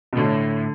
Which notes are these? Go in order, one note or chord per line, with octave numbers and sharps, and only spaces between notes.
B2
A2 D3